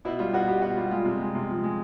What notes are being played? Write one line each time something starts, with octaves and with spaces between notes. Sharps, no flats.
B2 E4
G3 F4
B2 F#4
B2 G4
B2 F#4
G3 F4
G#3 F4
C3
G#3
C3
F3
G#3